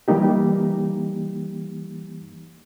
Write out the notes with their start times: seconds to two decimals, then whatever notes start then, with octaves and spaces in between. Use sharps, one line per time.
0.08 E3 G3 A#3 D#4 G4